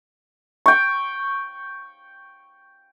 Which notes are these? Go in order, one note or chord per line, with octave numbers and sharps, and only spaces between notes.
G5 C#6